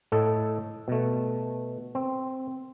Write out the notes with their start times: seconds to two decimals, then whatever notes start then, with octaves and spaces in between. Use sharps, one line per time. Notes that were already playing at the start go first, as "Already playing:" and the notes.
0.12 A2 A4 D#5
0.88 B2 A3
1.95 C4